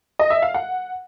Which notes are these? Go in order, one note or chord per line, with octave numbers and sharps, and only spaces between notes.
D#5
E5
F5
F#5